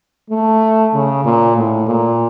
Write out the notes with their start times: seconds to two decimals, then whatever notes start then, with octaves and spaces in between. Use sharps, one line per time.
0.30 A3
0.93 C#3
1.25 A#2
1.56 A2
1.87 A#2